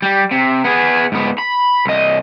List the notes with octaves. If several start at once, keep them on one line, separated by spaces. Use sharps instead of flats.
G3
C3
B3 G#4
G#2 B3
B5
C2 D#5